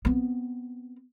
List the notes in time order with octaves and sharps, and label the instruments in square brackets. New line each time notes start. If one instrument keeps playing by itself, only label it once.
[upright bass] B3 C4